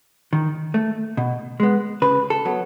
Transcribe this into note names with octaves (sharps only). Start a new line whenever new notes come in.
D#3
A3
B2
G#3 B3
C#3 B4
A4
F#3 B3